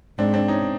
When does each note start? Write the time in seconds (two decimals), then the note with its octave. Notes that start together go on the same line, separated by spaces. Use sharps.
0.18 G#2 C4 D4
0.34 C4 D4
0.48 C#4 D#4